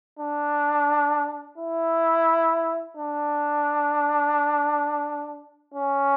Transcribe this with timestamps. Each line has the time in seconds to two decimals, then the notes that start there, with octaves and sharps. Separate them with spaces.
0.19 D4
1.58 E4
2.97 D4
5.74 C#4